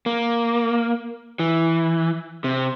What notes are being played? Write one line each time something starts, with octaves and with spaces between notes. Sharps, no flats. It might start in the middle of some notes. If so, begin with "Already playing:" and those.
A#3
E3
C3